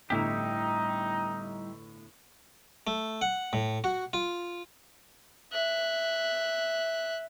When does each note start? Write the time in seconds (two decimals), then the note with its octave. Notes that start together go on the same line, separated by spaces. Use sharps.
0.10 G1 A2 G3 D#4 E4 G4
2.87 A3
3.22 F#5
3.53 A2
3.84 F#4
4.13 F4
5.52 E5 F#6